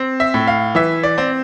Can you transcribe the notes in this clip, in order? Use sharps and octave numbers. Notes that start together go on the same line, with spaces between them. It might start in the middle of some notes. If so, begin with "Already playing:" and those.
Already playing: C4
E5
A2
F5
E3 E5
D5
C4